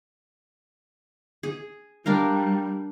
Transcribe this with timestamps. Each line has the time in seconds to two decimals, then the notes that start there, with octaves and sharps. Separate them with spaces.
1.43 G#4
2.06 G3 D4 A#4 F5